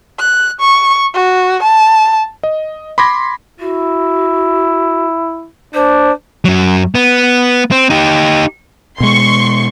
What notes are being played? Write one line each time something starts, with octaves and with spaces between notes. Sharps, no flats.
F#6
C#6
F#4
A5
D#5
B5 C6 D6 G#6 A#6
E4 F#4
D4 C5
F#2 F#3
B3
C4
D#4 G4
B2 G#3 C6 C#6